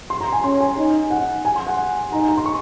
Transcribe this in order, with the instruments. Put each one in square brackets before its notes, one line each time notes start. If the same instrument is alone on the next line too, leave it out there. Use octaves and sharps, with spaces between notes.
[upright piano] C6
A#5
G#5
[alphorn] C#4 [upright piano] C6
[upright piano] G#5
[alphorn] D#4
[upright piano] F#5
G#5
C6
F#5
[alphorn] D#4 [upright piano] A#5
[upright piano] G#5
A#5
C6
C#6